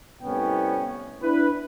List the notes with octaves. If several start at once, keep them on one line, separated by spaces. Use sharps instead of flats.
C2 A2 B3 C#4 G5
D4 E4 B4